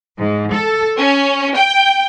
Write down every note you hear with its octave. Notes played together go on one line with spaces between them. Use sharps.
G#2
A4
C#4
G5